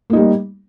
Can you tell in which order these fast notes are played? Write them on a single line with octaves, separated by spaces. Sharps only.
A#3 D#4 G3